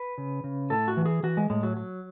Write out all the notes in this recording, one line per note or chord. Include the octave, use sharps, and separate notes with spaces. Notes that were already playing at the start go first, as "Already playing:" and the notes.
Already playing: B4
C#3
C#3
A2 A4
F#4
E3
G#4
E3 F#4
G#3
A2 G#3
F#3
F#3